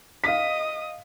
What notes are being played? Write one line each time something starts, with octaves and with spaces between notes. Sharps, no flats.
D#5 F5 D#6 B6